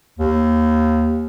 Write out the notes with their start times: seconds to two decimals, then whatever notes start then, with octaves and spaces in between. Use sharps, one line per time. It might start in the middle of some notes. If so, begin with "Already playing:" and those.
0.19 D#2